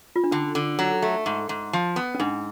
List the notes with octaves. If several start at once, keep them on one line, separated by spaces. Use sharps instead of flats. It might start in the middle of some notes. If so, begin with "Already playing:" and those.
F4
D4
D3 C#4
D3
F#3
A3
G#2
G#2
F3
B3
C#4
G#2 D4